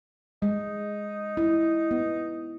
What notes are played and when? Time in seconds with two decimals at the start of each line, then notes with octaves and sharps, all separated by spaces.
0.42 G#3 D#4
1.37 E4
1.91 B3